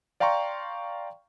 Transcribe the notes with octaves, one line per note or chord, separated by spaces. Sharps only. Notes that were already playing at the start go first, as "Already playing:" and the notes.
D5 F5 G5 A#5 C6 C#6